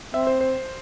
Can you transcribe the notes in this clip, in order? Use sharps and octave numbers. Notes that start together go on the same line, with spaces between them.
C4 E5
C5
C5